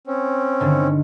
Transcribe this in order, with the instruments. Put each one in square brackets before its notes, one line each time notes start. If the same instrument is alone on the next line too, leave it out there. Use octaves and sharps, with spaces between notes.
[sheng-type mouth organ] C4 C#4
[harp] G2 D3 D#3